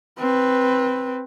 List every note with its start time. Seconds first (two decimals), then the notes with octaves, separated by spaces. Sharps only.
0.19 C4 B4